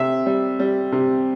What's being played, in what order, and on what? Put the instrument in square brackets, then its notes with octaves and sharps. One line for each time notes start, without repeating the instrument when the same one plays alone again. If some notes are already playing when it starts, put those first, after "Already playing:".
Already playing: [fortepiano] C3 E5
G3
G3
C3